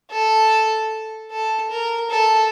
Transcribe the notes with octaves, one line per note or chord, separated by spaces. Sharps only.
A4
A4
A#4
A4